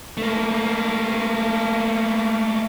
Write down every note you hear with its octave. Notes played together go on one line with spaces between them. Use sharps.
A3 A#3